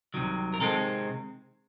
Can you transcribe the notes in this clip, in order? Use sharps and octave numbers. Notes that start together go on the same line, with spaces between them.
C2 C3 D#3 F#3
A#4
C3 D#3 G#3 C4 A4